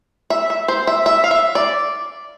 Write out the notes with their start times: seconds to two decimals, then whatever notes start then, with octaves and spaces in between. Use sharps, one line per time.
0.30 E5
0.50 E5
0.68 C5
0.87 E5
1.06 E5
1.24 F5
1.31 E5
1.55 D5